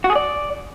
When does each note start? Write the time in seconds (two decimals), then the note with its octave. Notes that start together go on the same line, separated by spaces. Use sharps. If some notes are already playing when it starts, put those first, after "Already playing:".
0.04 F#4
0.10 G#4
0.16 D5